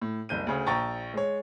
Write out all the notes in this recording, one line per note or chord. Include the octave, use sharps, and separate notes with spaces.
A2
F#1 C2 G6 D#7
D2 C#3
A#1 G5 A#5 C#6 A6
G#3 C#5